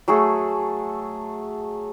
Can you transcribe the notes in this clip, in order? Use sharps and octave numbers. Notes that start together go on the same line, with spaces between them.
F#3 A3 G#4 A4